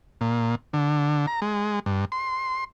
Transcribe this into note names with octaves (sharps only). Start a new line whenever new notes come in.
A#2
D3
A#5
G#3
G2
C6